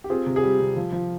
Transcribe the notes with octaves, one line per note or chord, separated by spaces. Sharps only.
G4
C4 F4 G#4
C3
G#4
G3 G4
C3
F3
F3